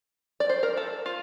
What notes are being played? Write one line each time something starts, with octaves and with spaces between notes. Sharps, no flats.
D5
C5
A#4
A4
F4